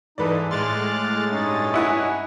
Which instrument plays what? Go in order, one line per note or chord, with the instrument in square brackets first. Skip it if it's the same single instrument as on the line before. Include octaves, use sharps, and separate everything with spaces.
[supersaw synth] G#2 E3 [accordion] D#4 [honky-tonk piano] A4 B4 D5
[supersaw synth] A2 G#3 A6 [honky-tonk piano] C6 [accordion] D6 F6 F#6
[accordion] G2 C#4 D#4
[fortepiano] E4 [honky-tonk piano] D#5 F#5 G#5